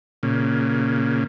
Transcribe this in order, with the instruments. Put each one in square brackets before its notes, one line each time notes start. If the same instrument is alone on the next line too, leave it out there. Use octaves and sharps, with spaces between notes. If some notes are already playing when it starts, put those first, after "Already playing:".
[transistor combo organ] A#2 C#3